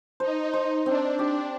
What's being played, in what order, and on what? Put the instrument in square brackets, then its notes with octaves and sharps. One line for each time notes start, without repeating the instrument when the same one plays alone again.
[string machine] D#4 [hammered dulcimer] C5
[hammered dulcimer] C5
[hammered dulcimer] C4 [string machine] D4
[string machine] D4 [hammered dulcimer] G4